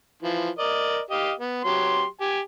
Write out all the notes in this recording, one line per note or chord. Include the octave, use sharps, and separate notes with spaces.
E3 F3
A#4 D5 D#5
G4 D#5 F5
B3
F#3 G4 C6
G4 G#5